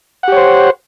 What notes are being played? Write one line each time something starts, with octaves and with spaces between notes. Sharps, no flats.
G4 C5 C#5 F#5